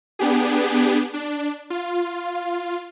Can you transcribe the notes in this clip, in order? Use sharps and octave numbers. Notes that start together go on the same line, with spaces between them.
B3 D4 G4 G#4
D4
F4